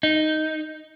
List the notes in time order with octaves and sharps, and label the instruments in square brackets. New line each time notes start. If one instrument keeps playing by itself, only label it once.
[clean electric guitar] D#4